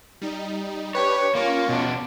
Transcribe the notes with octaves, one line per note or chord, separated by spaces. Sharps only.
G3 D#4
D4 G4 B4 C#5
A#3 C#4 F4 C#6
B2 D4